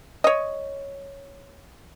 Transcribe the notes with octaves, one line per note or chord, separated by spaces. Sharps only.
C#5 D#5